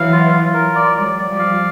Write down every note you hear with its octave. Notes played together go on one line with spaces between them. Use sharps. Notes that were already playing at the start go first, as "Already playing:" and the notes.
Already playing: E3 F#3 F5
F4
F4
A#4
D5
F#3 G#3 D5
D5
F3 G3
F5